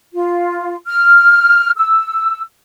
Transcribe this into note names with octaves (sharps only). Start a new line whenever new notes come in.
F4
F6
E6